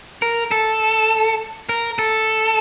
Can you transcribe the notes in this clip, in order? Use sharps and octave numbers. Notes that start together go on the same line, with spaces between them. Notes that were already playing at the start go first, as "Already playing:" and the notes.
A#4
A4
A#4
A4